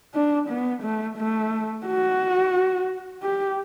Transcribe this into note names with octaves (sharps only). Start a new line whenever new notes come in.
D4
B3
A3
A3
F#4
G4